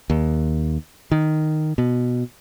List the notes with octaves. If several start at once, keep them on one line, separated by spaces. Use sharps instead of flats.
D#2
D#3
B2